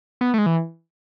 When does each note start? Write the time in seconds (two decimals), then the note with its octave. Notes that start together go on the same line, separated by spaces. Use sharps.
0.21 B3
0.34 A3
0.38 G#3
0.46 E3